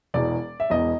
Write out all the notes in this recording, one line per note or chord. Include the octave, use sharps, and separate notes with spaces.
E1 E2 B2 D5
E5
E1 E2 B2 D#5